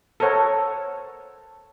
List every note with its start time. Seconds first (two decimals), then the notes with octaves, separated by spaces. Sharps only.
0.20 A4 A#4 C5 C#5 F#5